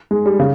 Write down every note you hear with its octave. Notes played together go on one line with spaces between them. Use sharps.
G#3
G3
C#3